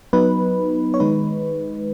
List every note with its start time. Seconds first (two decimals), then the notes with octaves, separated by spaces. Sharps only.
0.13 F#3 B3 D#4 B4
0.94 C#5
1.00 D#3 G#3 D#4 B4